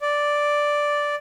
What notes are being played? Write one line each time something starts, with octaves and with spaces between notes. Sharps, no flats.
D5